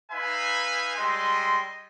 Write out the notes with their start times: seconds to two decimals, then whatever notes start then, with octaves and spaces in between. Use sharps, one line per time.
0.12 D#4 B4 E5 F5 G#5 B5
0.97 G3 G#3 D#5 E5 C6